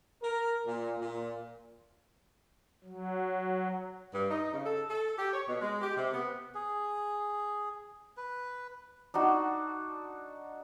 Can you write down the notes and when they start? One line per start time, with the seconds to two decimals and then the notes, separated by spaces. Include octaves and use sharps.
0.23 A#4
0.64 A#2
0.99 A#2
2.84 F#3
4.14 G2
4.30 D#4
4.53 C#3
4.66 A4
4.90 A4
5.18 G4
5.33 C#5
5.48 B2
5.61 G#3
5.82 G4
5.97 C3
6.13 B3
6.55 G#4
8.17 B4
9.14 D4 D#4 F#4